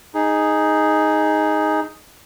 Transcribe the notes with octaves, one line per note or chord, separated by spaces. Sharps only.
D#4 G#4